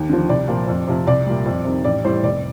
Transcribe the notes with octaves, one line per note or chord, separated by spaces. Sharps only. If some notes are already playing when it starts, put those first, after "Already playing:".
Already playing: D#2
D3 F3
C2 D5
A#2 F3
F2
C3 F3
C2 D5
A#2 G3
F2
C3 D#3
A1 D5
A2 G3 C5
F1 D5